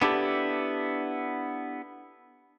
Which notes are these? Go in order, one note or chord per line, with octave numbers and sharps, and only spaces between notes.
B3 D4 E4 G4 A4